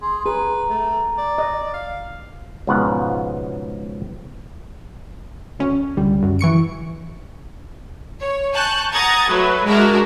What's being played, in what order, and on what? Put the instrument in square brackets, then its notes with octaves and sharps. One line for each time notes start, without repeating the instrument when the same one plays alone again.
[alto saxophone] G#4 [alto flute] C6
[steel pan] G#4 [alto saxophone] B4 [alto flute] A#5
[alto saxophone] A3
D5
[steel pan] D#5
[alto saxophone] F5
[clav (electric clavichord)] C#2 G#2 B2 F3 B3 F#5
[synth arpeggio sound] D2 C#4
C#2 D3 G3
F#2
E3 C#6 C#7 D7
[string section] C#5
G#5 A5 C#6 F#6 G6
F#5 A#5 D#6 G#6 A6
F#3 A3 B4
G#3 D4 F#4 A#4 E5